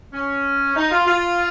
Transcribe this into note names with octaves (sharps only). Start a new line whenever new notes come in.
C#4
D#4
F4
F4